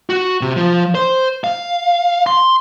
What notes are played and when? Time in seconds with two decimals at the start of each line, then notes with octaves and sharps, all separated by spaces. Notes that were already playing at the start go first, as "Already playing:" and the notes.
0.10 F#4
0.41 C3
0.56 F3
0.95 C5
1.44 F5
2.26 C6